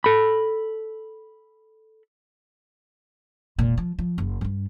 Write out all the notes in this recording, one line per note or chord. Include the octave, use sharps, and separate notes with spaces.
A4 B5
E1 A#2
F3
F3
F#1
G2 D4